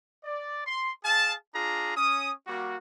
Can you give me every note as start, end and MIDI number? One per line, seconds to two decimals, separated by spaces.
0.24 0.62 74
0.66 0.91 84
1.04 1.34 68
1.04 1.34 77
1.04 1.34 81
1.55 1.91 62
1.55 1.91 65
1.55 1.91 68
1.55 1.91 82
1.96 2.31 61
1.96 2.31 87
2.47 2.77 55
2.47 2.77 58
2.47 2.77 66